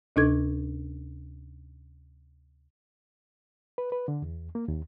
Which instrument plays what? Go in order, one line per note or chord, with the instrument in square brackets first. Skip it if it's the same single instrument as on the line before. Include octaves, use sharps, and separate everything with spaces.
[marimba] D2 C3 D4 D#4 A4 G#6
[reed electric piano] B4
B4
D3
E2
A#3
D#2